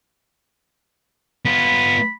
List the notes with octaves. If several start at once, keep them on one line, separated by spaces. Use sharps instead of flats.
B3 F4 B5